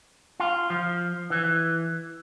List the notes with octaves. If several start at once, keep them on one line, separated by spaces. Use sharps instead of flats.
F4
F3
E3